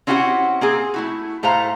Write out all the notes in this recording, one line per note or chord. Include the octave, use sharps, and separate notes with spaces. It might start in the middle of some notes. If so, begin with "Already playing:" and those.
C4 C#4 E4 F#4 G4 F#5
A#3 C4 G#4
A3 E4 F#4
A2 A3 C5 F5 A#5